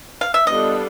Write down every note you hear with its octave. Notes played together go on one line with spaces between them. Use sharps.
F5
E5
G3 B3 D4 F4 A4 D#5